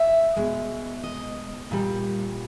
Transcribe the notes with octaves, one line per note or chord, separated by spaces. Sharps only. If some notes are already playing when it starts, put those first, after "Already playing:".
Already playing: E5
B2 G#3
D#5
A#2 G3